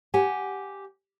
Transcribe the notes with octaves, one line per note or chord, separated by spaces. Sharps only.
G4 F#5 G#5